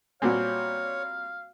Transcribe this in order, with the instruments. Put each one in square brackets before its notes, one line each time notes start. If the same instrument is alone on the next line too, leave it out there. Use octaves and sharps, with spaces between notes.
[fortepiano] A#2 G3 C4 [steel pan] F#4 G#5 [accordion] C#5 [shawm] F5